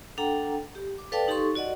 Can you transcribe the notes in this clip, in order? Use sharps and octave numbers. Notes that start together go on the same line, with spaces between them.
D4 A4 F#5 G5 A#5
G4
D6
A4 B4 D5 F5 G5 A5
D#4 G4 A4 C6 C#6
F#4 D5 D#5 F#5